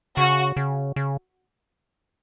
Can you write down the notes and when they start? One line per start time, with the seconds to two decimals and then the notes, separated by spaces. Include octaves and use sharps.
0.17 C#3 F#4
0.56 C#3
0.96 C#3